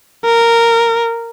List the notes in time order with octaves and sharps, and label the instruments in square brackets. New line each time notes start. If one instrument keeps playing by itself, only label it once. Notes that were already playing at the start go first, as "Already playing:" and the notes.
[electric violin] A#4